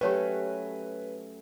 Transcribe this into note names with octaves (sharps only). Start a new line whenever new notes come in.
F#3 A3 C#4 G4 B4 C#5 G5